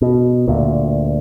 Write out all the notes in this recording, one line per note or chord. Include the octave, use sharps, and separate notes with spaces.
B2
D2 A#2